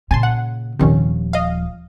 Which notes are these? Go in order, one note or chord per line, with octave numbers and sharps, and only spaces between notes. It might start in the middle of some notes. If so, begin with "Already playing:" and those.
A#2 C#3 G#5 A5 C6
F#5
D#1 C3 D#3 F3 C#4
D#5 F5